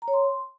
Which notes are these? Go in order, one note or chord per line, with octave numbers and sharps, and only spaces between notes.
A#5
C#5
C6